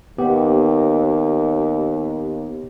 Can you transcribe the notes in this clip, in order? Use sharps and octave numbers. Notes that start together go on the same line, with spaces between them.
D#2 B3 G4